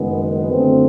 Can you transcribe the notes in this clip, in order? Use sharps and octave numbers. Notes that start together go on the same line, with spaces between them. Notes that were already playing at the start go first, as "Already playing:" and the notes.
Already playing: F#1 F#2 D#3 G#3 B3
F#2 D3 F#3 A3 C4